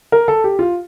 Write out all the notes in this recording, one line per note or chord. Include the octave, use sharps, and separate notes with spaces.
A#4
A4
G4
F4